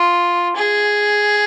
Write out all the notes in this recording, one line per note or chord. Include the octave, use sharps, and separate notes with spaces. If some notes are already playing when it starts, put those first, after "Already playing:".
Already playing: F4
G#4